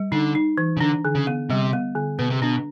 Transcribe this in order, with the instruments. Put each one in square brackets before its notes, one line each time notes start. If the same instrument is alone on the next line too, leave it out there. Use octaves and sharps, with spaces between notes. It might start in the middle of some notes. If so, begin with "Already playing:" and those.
Already playing: [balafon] G3
[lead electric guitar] D3 [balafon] D#4
[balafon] D#4
E3
[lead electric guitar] C#3
[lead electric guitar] D3 [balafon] D4
[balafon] D3
[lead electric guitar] C#3
[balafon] B3
[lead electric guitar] C3 [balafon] G3
[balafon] B3
D3
[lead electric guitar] B2 [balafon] B4
[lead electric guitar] C3
[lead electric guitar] B2 [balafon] D4